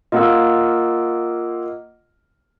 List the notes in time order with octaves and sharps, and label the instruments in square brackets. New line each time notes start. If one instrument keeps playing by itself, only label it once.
[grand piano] A#3 F4 [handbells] D#5 F#5 E6